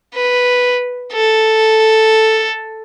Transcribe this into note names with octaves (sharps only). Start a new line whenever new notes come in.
B4
A4